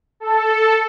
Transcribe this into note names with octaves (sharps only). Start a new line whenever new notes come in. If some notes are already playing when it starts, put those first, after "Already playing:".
A4